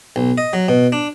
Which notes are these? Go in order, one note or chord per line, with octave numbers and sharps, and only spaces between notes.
B1
D#5
F#3
B2
D4